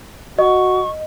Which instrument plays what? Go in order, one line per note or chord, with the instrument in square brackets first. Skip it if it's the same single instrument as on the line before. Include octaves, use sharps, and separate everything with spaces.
[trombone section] F#4 [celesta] D#5 [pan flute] C#6